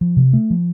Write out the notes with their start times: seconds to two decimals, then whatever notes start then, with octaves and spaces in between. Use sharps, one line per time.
0.01 F3
0.17 C3
0.33 A3
0.50 F3